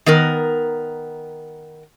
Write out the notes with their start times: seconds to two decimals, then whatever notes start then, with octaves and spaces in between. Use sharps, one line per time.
0.06 D#3 B3 A#4